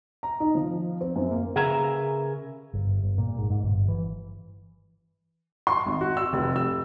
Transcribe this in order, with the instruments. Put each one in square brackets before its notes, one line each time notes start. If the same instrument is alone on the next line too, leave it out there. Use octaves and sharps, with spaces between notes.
[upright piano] A#5
D#4
F3
C4
F#2
A#3
[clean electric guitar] C#3 G#4 A#4 B4 E5 A#5
[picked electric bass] G1
G1
A#2
G#2
G#2
G1
E3
[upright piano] C6
G#1
F#4
E6
F1
E6